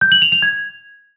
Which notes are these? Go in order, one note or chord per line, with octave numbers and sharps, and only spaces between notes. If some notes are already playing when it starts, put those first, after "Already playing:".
G6
F#7
F7
F7
G#6